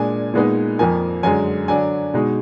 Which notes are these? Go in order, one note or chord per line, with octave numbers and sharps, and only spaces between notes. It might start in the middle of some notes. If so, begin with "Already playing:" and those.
Already playing: A#2 G#3 D4 G#5
A#2 G#3 B3 D#4
F2 F3 A#3 G#5
F#2 D3 G#3 G#5
D3 F#3 D4 G#5
B2 G#3 D#4